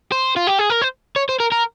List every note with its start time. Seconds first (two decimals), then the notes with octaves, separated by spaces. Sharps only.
0.12 C5
0.37 F4
0.47 G4
0.59 G#4
0.70 A#4
0.82 C5
1.16 C#5
1.29 C5
1.40 A#4
1.52 A#4